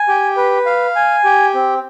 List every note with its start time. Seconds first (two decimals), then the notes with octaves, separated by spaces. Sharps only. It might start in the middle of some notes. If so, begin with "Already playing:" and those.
Already playing: G#5
0.08 G4
0.37 B4
0.66 F5
0.96 G#5
1.24 G4
1.54 C4